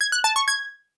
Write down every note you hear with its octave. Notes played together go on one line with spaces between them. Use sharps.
G#6
F#6
A5
C#6
G#6